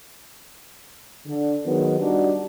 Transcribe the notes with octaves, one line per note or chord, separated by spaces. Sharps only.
D3
D#3 F#3 G#3 B3
G3 D4 D#4 F#4